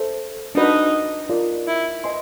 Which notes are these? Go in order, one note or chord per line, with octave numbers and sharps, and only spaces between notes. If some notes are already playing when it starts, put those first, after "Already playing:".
Already playing: A4 C5 E5 A5
D4 D#4 F#4 B4
F4 A#4 D5
E4
B4 D#5 G#5 C6